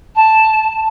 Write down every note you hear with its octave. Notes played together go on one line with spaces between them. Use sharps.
A5